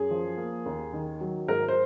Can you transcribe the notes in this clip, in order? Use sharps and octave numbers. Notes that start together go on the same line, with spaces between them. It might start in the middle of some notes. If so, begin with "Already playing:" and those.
Already playing: F#2 G#4
F3
A#3
D#2
D#3
F#3
G#2 A#4
C5